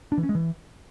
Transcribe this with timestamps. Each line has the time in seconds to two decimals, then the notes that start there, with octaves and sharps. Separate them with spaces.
0.12 D4
0.18 E3
0.23 C#4
0.29 G#3
0.35 E3